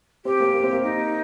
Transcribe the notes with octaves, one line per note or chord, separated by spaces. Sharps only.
C4 G4
A#3
A#3
C4
A#3
D#4